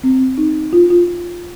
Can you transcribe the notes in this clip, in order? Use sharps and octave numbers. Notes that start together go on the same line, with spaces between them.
C4
D#4
F4
F4